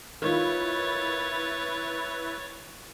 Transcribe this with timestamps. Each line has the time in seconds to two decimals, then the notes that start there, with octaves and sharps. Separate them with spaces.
0.22 D#3 E4 F4 B4 C#5 A6